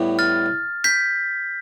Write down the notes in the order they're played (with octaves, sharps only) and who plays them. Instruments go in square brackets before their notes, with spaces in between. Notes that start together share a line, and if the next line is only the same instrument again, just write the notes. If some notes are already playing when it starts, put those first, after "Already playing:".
Already playing: [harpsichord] A2 G3 B3
[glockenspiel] F6 A6
G6 B6